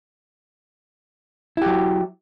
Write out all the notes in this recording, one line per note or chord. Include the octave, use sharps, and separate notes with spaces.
F#3 E4 G4